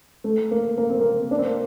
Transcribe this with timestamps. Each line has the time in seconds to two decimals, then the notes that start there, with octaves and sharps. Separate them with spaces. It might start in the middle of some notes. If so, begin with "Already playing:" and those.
0.24 A3
0.51 A#3
0.78 A#3
0.89 C4
1.01 A#3
1.31 D4
1.38 C4
1.46 A#3